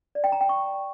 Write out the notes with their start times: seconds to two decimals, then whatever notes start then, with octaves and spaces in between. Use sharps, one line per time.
0.15 D5
0.24 G5
0.32 A#5
0.41 G5
0.49 C#6